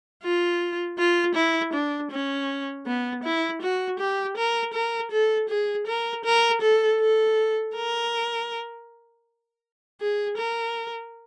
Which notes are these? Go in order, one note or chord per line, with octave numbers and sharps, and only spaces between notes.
F4
F4
E4
D4
C#4
B3
E4
F#4
G4
A#4
A#4
A4
G#4
A#4
A#4
A4
A4
A#4
G#4
A#4